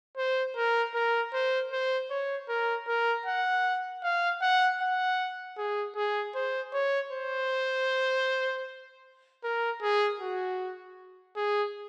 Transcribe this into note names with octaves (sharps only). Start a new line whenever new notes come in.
C5
A#4
A#4
C5
C5
C#5
A#4
A#4
F#5
F5
F#5
F#5
G#4
G#4
C5
C#5
C5
A#4
G#4
F#4
G#4